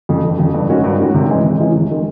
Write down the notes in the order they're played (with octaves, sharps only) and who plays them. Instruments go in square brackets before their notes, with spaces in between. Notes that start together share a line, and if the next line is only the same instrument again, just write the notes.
[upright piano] F2 C#3
F1
F2 C#3
G2
D#3 G#3 C#4 F#4
G2
D#3 G#3 C#4 F#4
C3
E3 G#3 C#4 E4
C3
E3 G#3 C#4 E4
F1
D#3 G#3